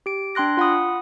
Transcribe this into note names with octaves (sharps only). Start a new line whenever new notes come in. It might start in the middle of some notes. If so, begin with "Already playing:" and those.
G4 D7
D4 G5 C6 F#6 A#6
F4 F#5 B5 D#6